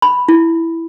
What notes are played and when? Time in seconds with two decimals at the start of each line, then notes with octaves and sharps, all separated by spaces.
0.02 B5
0.29 E4